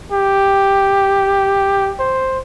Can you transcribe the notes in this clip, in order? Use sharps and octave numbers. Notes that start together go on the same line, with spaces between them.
G4
C5